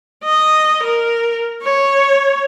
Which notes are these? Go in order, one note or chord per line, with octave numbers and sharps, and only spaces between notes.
D#5
A#4
C#5